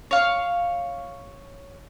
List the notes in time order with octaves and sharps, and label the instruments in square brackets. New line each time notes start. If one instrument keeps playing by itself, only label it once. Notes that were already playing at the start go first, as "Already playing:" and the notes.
[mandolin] C#5 F5